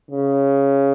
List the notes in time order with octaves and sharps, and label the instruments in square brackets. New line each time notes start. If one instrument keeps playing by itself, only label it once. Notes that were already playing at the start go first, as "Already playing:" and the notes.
[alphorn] C#3